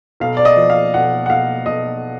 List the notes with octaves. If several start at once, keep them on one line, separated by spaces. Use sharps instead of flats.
B1 F5
D5
D#5
F3
F5
B1 F#5
F#5
B1 F5
B1 D#5